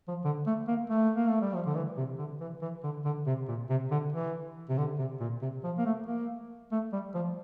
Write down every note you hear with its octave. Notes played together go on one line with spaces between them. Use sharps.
F3
D3
A3
A#3
A3
A#3
A3
G3
F3
D3
E3
C3
D3
E3
E3
D3
D3
C3
A#2
C3
D3
E3
C3
D3
C3
A#2
C3
F3
A#3
A3
A#3
A3
G3
F3